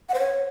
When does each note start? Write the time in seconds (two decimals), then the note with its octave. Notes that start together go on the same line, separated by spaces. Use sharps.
0.09 F#5
0.14 C5
0.19 C#5